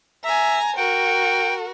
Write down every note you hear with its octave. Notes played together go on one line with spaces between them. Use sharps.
E5 G#5 A#5
F#4 A#4 G5